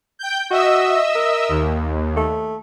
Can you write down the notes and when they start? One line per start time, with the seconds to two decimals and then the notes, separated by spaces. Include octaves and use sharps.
0.19 G5 G6
0.51 F#4 D#5 E5 E6
1.15 A#4
1.49 D#2
2.16 A3